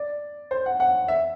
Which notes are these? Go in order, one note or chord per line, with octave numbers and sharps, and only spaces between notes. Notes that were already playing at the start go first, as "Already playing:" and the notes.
Already playing: D5
C5
F#5
F#5
E5